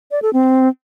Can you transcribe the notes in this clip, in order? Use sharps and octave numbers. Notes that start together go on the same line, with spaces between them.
D5
A4
C4